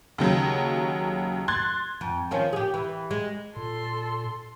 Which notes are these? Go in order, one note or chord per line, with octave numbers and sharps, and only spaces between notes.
D#2 C#3 F#3
C6 F#6 G#6 A6
F2
D#3 F3 C#4
G4 G#4
E3
G#3
A#2 A4 C6